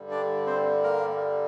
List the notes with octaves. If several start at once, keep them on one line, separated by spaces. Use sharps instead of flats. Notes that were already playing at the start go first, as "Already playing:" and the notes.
Already playing: G2 D3 G3
D4 D5
C4 C5
A#3 A#4